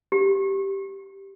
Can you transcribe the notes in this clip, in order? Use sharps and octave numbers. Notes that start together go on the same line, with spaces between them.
G4